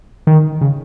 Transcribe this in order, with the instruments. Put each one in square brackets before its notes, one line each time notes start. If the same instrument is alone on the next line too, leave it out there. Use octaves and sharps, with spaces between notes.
[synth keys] D#3
C#3